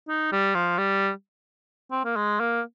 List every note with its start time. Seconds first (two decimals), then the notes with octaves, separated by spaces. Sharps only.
0.09 D#4
0.32 G3
0.54 F3
0.78 G3
1.91 C4
2.04 A#3
2.16 G#3
2.40 A#3